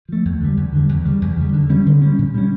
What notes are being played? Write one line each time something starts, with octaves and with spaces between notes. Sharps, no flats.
F3 A3
E2
D3 G3
E2
D3 G3
E2
C#3 G3
E2
C#3 G3
D3
G3 C#4
D3
G3 C#4
A#2
G3 C#4